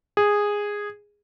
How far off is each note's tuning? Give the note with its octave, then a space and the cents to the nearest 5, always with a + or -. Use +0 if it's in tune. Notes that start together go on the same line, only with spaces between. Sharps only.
G#4 -10